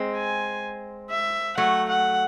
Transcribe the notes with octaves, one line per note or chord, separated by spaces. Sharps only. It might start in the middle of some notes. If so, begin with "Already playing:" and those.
Already playing: G#3 C4
G#5
E5
F#3 A3 F#5
F#5